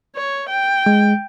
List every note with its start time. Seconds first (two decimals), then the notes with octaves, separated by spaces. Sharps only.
0.16 C#5
0.49 G5
0.86 G#3